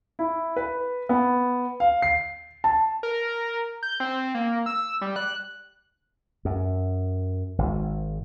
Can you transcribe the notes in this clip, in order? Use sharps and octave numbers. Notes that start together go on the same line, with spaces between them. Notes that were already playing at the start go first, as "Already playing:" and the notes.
E4
B4
B3
F5
C7
A5
A#4
G6
C4
A#3
E6
G3
F#6
F#2
G#1